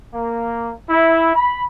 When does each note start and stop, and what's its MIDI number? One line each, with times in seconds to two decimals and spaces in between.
0.14 0.72 58
0.89 1.34 64
1.35 1.63 83